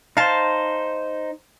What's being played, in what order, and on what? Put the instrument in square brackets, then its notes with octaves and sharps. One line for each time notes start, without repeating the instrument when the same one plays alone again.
[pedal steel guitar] D#4 C5 [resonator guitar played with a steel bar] F5 A5